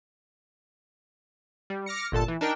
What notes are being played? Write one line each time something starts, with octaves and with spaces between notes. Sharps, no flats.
G3
D6 F6 A#6 C#7
G1 A#2 A4 A5
E3
D4 D#4 A#4 G5